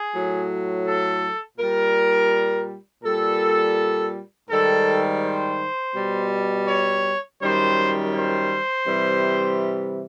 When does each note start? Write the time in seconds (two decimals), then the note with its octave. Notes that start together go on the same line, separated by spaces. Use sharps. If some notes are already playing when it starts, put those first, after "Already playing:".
Already playing: G#4
0.14 A2 F#3
0.86 A4
1.58 A#2 G3 A#4
3.04 A#2 G3 A4
4.49 G#2 D#3 G3 A4
5.23 C5
5.95 B2 G3
6.68 C#5
7.41 F#2 D#3 G3 C5
8.14 C5
8.86 C3 E3 G3